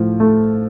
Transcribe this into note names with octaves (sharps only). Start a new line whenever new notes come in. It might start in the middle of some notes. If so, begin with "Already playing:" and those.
Already playing: A2 F3
A3